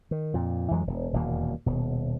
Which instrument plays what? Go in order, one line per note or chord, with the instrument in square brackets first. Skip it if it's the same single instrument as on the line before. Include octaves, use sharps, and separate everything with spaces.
[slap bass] D#3
F2 A#2
F2 E3 F#3 G#3
E1
D#1 E2 B2 A#3
D#1 B2